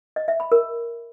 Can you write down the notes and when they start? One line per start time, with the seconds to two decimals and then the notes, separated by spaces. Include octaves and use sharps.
0.16 D#5
0.28 E5
0.40 B5
0.52 A#4